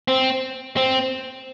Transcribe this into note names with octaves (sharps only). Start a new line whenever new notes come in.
C4
C4